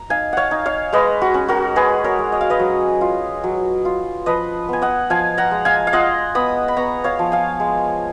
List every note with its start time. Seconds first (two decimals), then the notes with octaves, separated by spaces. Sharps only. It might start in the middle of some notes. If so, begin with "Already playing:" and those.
Already playing: A#5
0.10 D#4 F5 G#5
0.33 C#5 F5 F#5
0.51 D#4
0.66 C#5 F5
0.93 G#3 B4 D#5
1.21 F#4
1.34 C#4
1.48 F#4 A#4
1.76 G#3 G#4 B4
2.04 A#4 C#5
2.19 G#3
2.32 D#5
2.41 F5
2.50 B4 D#5
2.59 F#3
3.01 F4
3.44 F#3
3.85 F4
4.26 F3 B4 D#5
4.69 B3 G#5
4.82 D#5 F#5
5.10 F3 F5 G#5
5.38 F#5 A#5
5.51 G#3
5.65 F5 G#5
5.87 F5
5.93 F4 D#5 F#5
6.35 B3 B5 D#6
6.68 B5
6.76 B3 A#5 C#6
7.04 C#5 F5
7.19 F3
7.32 F5 G#5
7.60 G#3